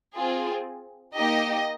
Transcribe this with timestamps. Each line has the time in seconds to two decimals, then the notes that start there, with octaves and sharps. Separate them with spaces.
0.14 C4 F4 G#4
1.16 A#3 D#4 G4 D#5